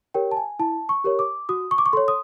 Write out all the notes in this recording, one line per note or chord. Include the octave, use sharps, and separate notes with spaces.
G4 A#4 C#5 G5
A5
G#5
E4 A5
C#6
G4 A#4 C#5
D6
F#4 D#6
C#6
D6
C#6
A4 C#5 C6
D#6